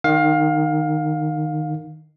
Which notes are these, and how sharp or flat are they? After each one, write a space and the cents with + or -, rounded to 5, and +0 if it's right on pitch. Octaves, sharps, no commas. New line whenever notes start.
D#3 -15 F5 +20